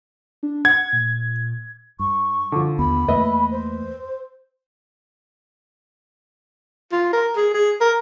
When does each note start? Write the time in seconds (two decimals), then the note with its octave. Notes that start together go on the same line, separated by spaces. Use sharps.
0.43 D4
0.65 F#5 G#6
0.93 A#2
1.99 G2 C#6
2.52 D3 F3
2.79 D#2 B3 B5
3.08 E2 A3 A#3 B4 D#5 E5
3.51 C5
6.92 F4
7.13 A#4
7.36 G#4
7.54 G#4
7.81 A#4